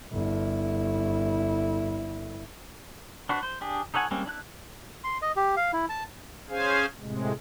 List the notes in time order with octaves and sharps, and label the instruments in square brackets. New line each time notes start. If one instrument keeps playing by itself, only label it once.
[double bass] G1 E4
[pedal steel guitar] D4 F#4 B4 C5
C5
D4 G4 G#4
D#4 A4 C#5 F#5 G#5
G3 G#3 A#3 C4 C#4
D4 E4 F#6
[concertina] C6
D#5
G4
F5
E4
A5
[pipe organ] C#4 G#4 C5 F5 G#5
A2 C3 G#3